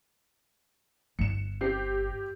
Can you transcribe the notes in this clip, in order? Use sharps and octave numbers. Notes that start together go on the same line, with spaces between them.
G1 C#7 E7
C4 G4 C7